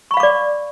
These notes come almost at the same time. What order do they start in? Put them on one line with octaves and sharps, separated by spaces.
C#6 B5 F5 D6 D5